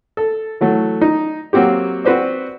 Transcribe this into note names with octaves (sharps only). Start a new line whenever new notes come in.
A4
E3 F#3 A3
D#4
F#3 A#3 C4 F#4 G4
C4 F#4 B4 C5 D5